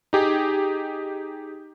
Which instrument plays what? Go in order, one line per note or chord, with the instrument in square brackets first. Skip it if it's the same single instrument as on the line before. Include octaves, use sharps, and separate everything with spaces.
[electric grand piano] D#4 G4 G#4